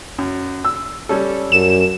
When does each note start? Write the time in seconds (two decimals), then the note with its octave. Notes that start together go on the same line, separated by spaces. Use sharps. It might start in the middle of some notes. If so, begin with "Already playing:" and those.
0.18 F#2
0.65 E6
1.09 G3 C#4 A4
1.52 F#2 E7